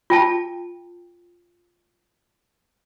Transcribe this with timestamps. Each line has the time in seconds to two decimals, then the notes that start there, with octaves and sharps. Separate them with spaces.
0.10 F4 G5 A5